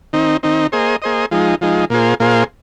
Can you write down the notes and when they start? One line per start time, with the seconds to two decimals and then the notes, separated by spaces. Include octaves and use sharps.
0.13 D#3 C4 D#4
0.43 D#3 C4 D#4
0.72 A#3 G#4 C5 D#5
1.02 A#3 G#4 C5 D#5
1.31 F3 G#3 D#4
1.61 F3 G#3 D#4
1.90 A#2 A#3 F4 G#4 C5
2.20 A#2 A#3 F4 G#4 C5